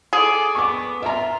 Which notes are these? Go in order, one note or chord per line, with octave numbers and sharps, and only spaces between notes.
G#4 A4 D6
B3 C#6 D6
F4 E5 A#5